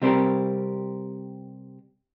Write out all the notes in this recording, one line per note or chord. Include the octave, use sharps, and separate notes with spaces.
C3 G3 C4 G4 A#4